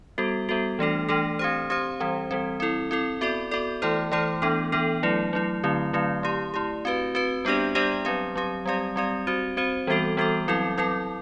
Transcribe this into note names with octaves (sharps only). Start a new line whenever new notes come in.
G3 B3 F#4 A4
G3 B3 F#4 A4
E3 A3 D4 A4
E3 A3 D4 A4
C4 G4 C5
C4 G4 C5
E3 G3 C4
E3 G3 C4
C4 E4 A4
C4 E4 A4
B3 F#4 A4 D5
B3 F#4 A4 D5
E3 A3 E4 A4 C5
E3 A3 E4 A4 C5
E3 B3 D4 A4
E3 B3 D4 A4
F#3 A3 E4
F#3 A3 E4
D3 F#3 A3 C4 E4
D3 F#3 A3 C4 E4
A3 E4 G4
A3 E4 G4
C4 F#4 B4
C4 F#4 B4
G3 B3 D4 G4 D5
G3 B3 D4 G4 D5
F#3 C4 G4
F#3 C4 G4
G3 C4 G4 D5
G3 C4 G4 D5
C4 F#4 C5
C4 F#4 C5
E3 G3 B3 F#4 A4
E3 G3 B3 F#4 A4
F#3 C4 E4 A4
F#3 C4 E4 A4